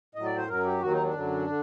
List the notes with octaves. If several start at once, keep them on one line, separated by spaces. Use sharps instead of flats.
A2 F#3 D#5
D5
C5
F#2 F#3 A#4
G4
D#2 D#3 F#3 F#4
D#4
D4
F#2 D3 F#3
D3